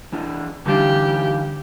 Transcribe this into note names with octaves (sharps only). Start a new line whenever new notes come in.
E3 D4
D3 E3 G3 D4 D#4 G4 F5